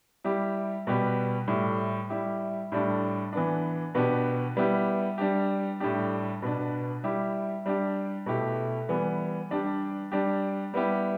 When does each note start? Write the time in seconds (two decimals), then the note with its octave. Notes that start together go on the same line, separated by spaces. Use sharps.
0.24 G3 E4 G4
0.87 B2 G3 B3 G4
1.48 A2 G3 E4 G4
2.10 G3 E4 G4
2.72 A2 G3 D4 G4
3.33 E3 B3 D4
3.95 B2 B3 D4 G4
4.57 G3 B3 E4 G4
5.18 G3 D4 G4
5.80 A2 G3 D4 G4
6.42 B2 B3 D4
7.04 G3 E4 G4
7.66 G3 D4 G4
8.26 B2 A3 E4 G4
8.89 E3 G3 B3
9.51 G3 D4 G4
10.12 G3 D4 G4
10.74 G3 B3 E4 G4